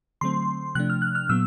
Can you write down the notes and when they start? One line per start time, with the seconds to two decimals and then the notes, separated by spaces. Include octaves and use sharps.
0.21 D3 F#3 A3 C4 C6
0.75 C3 F3 A3 D4 F#6
0.90 F6
1.02 F#6
1.15 F6
1.29 A#2 F#3 B3 E6